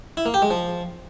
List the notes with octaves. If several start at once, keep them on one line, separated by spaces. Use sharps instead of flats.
E4
A#3
G4
G#3
F3